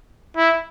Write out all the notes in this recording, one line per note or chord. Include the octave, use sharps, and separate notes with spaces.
E4